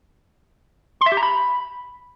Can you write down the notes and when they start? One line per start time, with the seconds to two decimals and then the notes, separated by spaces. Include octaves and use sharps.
1.01 C6
1.06 E5
1.12 G4
1.17 A#5
1.23 B5